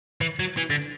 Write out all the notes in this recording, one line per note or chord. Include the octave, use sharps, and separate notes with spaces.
E3
F#3
E3
D3